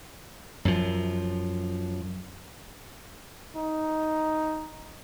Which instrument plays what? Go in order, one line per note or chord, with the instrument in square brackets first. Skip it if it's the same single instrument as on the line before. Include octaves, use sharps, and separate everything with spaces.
[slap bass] F#2 F3
[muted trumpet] D#4